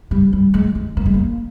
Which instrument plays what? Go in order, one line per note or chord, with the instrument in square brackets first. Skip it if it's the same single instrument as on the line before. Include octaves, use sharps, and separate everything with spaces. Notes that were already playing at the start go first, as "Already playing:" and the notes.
[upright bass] G3
G3
G#3
G#3
A#3
G#3
A#3